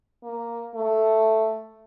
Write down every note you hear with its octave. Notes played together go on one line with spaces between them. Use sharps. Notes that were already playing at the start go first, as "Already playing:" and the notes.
A#3
A3